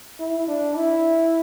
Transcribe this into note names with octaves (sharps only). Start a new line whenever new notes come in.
E4
D4
E4